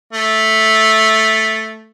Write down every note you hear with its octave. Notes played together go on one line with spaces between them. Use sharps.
A3